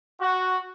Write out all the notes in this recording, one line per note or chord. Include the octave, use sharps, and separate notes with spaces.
F#4